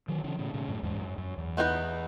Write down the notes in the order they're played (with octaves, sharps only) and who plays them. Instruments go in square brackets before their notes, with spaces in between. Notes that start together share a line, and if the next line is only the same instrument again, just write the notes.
[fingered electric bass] D#3 F#3
C#3 E3
A2 C#3
A2 C#3
F#2 A2
E2 G#2
F#2
F#2
E2
[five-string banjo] E3 B3 D#4 G#4 B4